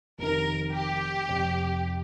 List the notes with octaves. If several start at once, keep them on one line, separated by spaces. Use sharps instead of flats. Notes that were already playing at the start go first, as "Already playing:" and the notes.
F1 F2 D#3 A#4
G4
F1 F2 C3 F3